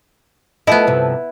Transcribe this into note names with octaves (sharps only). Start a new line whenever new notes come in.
F3 A3 B3 E4 D#5
G2 C3 F3